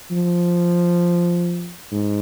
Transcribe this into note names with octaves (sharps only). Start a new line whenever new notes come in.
F3
G#2